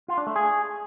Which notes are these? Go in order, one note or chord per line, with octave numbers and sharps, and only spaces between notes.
F4
D4
A3
G#4